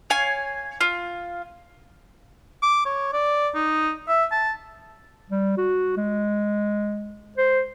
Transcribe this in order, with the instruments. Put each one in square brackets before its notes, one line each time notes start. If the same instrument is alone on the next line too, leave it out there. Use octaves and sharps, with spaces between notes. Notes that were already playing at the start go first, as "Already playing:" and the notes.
[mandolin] C#5 F5 G#5
F4
[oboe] D6
C#5
D5
D#4
E5
A5
[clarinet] G3
F#4
G#3
C5